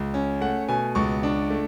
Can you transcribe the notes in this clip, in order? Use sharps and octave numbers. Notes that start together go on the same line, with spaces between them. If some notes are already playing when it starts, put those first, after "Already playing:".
Already playing: C#2
C#4
A3 F#5
B2 G#5
C#2 C#6
D4
A3